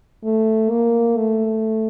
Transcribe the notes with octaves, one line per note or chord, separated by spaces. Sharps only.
A3
A#3
A3